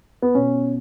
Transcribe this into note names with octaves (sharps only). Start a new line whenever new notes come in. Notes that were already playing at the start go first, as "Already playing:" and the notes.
B3
B2 C#4